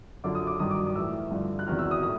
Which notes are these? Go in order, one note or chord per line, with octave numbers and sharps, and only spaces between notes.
F#2 D3 F3 D6
D#6
D6
G2 D#3 F#3 D#6
D6
D#6
A2 E3 E6
G2 D3 F3
F#6
E2 C3 D#3 F#3 F6
E6
D#6
A2 D#6